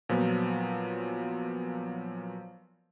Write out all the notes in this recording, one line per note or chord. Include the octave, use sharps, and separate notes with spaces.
A#2 F3 F#3 B3